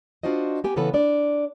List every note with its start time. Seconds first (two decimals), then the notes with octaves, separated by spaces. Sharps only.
0.23 D4 F4 F#4 C5 D#5
0.64 B3 G4 G#5
0.76 C#3 E3 B3 A4 B4
0.94 D4 D5